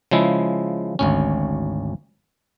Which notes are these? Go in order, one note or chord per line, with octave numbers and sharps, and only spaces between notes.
C#3 F3 G#3 E4
G#1 D2 C#4